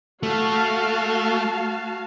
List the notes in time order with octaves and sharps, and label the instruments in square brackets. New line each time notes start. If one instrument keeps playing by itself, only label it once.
[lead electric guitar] A3 [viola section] F#4 F5 A5